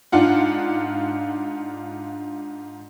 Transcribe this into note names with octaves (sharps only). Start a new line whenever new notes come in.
G#2 D4 F4 F#5